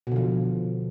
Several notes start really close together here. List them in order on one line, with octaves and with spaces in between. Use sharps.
B2 D3 F3